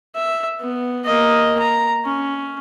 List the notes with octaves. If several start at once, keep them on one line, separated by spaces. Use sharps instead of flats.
E5
B3
A#3 D#5
A#5
C#4